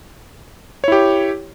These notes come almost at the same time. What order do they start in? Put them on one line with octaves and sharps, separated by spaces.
C#5 E4 G4